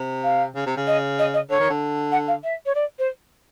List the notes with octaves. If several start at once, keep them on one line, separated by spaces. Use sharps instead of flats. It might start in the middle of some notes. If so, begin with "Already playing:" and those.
Already playing: C3
F5
C#3
C3
C#3
D#5
D#5
D#5
D3 C#5
D#3
D3
F#5
F5
E5
C#5
D5
C5